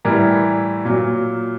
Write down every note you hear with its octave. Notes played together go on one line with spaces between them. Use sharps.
A2 E3 G3 A#4
A#2 F#3